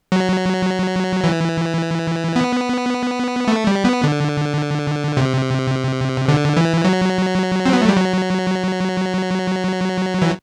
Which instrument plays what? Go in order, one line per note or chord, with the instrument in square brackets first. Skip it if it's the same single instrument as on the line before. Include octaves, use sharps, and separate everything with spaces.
[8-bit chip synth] F#3
E3
B3
A3
G3
B3
D3
C3
D3
E3
F#3
C4
B3
A3
G3
F#3
E3